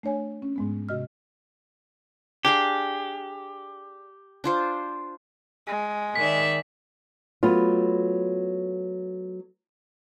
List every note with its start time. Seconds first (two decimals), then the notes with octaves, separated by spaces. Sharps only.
0.03 A3 D4 C#5 G#5
0.42 C#4
0.56 G#2 G#3 B3
0.89 C3 F#4 D#5 F6
2.45 D4 G4 G#4 F5
4.44 D4 F4 C5
5.67 G#3
6.15 D#3 D5 E5 B6
7.43 F#3 A3 B3 F4